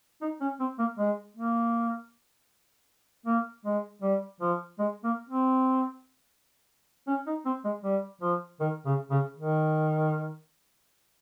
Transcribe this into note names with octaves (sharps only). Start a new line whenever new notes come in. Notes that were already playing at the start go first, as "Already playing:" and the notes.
D#4
C#4
C4
A#3
G#3
A#3
A#3
G#3
G3
F3
G#3
A#3
C4
C#4
D#4
C4
G#3
G3
F3
D#3
C#3
C#3
D#3